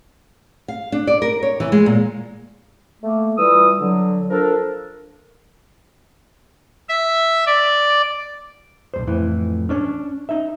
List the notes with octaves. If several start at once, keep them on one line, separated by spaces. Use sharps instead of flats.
F5
D4
D5
A#4
C#5
E3
G#3
A#2
A3 A#3
E3 G3 F4 D#6 E6
D3 F#3
F3 D4 A4 A#4
E5
D5
B1 F2 C5
F2 A2 E3
C#4 D4 C#5
D#4 E5